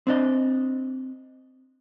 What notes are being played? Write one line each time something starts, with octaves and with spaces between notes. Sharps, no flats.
C4 D4 D#5